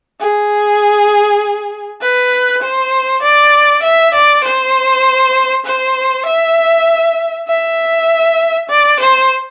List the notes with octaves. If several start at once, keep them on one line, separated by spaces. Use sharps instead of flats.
G#4
B4
C5
D5
E5
D5
C5
C5
E5
E5
D5
C5